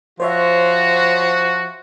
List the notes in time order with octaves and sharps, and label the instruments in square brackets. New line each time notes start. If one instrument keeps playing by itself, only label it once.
[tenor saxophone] F3 [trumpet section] F#4 [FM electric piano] C5 C#5 E5